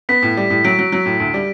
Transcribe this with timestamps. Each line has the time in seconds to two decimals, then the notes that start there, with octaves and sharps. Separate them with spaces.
0.09 B3 B6
0.22 A2
0.37 G3
0.50 A2
0.64 F#3 D7
0.79 F#3
0.92 F#3
1.05 A2
1.20 D2 D7
1.34 G3